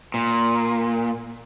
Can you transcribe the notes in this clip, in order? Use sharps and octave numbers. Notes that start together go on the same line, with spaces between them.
A#2